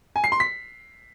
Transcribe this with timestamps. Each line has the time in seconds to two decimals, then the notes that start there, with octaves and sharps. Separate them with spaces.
0.16 G#5
0.24 C7
0.32 C6
0.40 B6